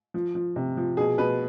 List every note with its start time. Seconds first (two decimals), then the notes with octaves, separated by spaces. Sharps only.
0.14 F3
0.35 F3
0.56 C3
0.77 F3
0.97 B2 G#4
1.18 B2 B4